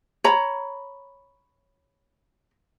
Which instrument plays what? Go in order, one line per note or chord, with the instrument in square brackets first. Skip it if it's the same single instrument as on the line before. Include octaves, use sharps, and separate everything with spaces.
[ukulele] C#5 A#5 B5